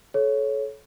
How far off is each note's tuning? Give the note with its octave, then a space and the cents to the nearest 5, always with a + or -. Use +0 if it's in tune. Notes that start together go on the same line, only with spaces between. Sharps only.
A4 -30 C#5 +0